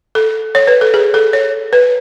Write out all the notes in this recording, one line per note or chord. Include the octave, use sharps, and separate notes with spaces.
A4
C#5
B4
A4
G#4
A4
C#5
B4